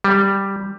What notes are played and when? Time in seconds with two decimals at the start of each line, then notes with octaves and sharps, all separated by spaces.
0.04 G3